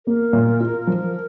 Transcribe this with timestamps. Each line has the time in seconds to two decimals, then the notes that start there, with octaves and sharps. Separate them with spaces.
0.07 A#3 A#4
0.33 A#2
0.60 F4
0.87 F3